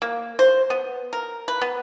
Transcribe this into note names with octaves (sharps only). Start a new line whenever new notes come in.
A#3
C5
B3
A#4
B4
B3